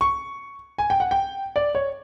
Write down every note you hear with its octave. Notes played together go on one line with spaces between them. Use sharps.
C#6
G#5
G5
F#5
G5
D5
C#5